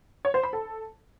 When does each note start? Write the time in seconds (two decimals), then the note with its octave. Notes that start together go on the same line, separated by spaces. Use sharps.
0.25 C#5
0.34 C5
0.44 B5
0.53 A4